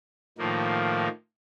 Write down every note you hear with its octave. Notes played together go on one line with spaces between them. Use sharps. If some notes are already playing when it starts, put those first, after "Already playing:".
A2 D#3 F3 A#3